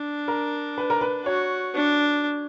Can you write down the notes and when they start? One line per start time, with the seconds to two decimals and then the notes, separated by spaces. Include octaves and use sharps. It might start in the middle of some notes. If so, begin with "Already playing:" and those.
Already playing: D4
0.28 A#4
0.78 B4
0.90 A#4
1.01 B4
1.26 F#4 C#5
1.75 D4